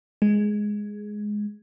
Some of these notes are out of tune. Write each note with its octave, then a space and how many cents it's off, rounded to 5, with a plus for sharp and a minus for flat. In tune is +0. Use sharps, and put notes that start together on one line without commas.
G#3 +5